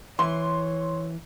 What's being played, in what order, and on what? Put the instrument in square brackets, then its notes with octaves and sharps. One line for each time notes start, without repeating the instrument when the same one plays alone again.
[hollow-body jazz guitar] E3 [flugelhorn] C#5 [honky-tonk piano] C6